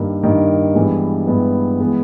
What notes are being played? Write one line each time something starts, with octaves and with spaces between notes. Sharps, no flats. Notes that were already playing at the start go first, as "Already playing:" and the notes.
Already playing: G2 D#3 A#3
G2 D#3 A#3
G2 E3 G#3 B3
G2 E3 G#3 B3
E3 G#3 B3